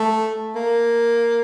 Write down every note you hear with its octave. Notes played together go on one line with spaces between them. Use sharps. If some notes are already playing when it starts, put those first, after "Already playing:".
Already playing: A3
A#3